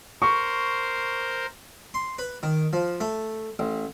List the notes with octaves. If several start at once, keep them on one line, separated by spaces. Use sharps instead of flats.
A#4 C5 C#6
C6
B4
D#3
F3
A3
A1